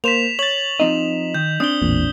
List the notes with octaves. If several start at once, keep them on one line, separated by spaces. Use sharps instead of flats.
A#3 C5 B6 E7 F7
C#5 A6 F#7
F3 C4 D#4 D#5
D#3 G6
C4 D4 D#6 G7
A1 E2 A#2